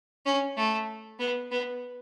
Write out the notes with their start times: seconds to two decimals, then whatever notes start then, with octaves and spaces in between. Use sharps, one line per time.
0.26 C#4
0.57 A3
1.19 B3
1.51 B3